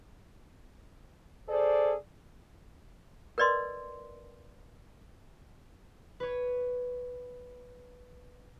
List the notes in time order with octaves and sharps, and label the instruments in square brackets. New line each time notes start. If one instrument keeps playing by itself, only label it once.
[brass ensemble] G#4 A4 C5 D5
[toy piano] A#4 B4 D5 D#5 C6
[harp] B4 C#5